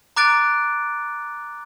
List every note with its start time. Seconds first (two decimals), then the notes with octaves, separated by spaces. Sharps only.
0.16 A#5 D6 F#6 A6 D7